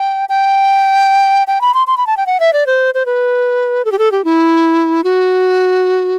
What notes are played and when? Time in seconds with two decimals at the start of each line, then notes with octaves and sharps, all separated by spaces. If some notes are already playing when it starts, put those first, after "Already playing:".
Already playing: G5
0.29 G5
1.47 G5
1.61 B5
1.74 C6
1.87 C6
1.97 B5
2.07 A5
2.17 G5
2.27 F#5
2.40 E5
2.53 D5
2.67 C5
2.94 C5
3.06 B4
3.85 A4
3.92 G4
3.99 A4
4.12 G4
4.25 E4
5.04 F#4